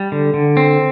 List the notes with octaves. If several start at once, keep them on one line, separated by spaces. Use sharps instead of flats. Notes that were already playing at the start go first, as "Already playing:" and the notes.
Already playing: G3
D3
D3
C4